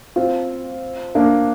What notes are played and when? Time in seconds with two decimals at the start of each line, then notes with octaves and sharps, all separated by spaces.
0.16 C4 F4
1.15 A#3 D4